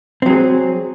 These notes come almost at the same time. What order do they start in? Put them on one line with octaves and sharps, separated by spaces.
C4 F#3 G#4